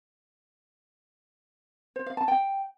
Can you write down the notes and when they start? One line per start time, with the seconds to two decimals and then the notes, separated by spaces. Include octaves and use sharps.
1.96 C5
2.06 F5
2.17 A5
2.28 G5